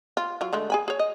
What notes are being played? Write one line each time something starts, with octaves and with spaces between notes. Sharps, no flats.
F4
F#3 F4
D3 G#3 A3
G#4 G#5 B5
G#4 C#5
D#5